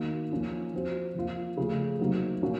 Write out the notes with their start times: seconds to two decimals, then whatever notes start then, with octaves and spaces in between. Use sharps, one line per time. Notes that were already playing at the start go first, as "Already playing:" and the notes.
Already playing: D#3 A#3 D#4 F#4
0.31 F3 A#3 C#4 F4
0.73 F3 C4 F#4
1.15 F3 A#3 F4
1.57 C#3 F3 A3
1.99 C3 F#3 A#3 D#4
2.42 A#2 F3 A#3 C#4 F#4